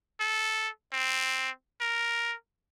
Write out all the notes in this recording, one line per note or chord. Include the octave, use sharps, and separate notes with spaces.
A4
C4
A#4